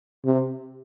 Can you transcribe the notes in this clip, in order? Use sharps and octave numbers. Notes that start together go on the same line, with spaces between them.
C3